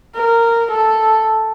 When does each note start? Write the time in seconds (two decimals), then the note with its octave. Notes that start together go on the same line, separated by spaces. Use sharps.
0.16 A#4
0.70 A4